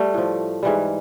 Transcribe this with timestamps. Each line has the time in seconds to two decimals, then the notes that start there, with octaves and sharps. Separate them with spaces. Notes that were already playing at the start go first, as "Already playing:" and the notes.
Already playing: G3 A3
0.14 A2 F3
0.63 G#2 E3 G3